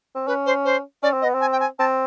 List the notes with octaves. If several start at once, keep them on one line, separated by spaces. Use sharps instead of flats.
C4
C#4 B4
C5
C5
C#4 D5
C4
B3 D#5
C4
G#5
G5
G#5
C4 A5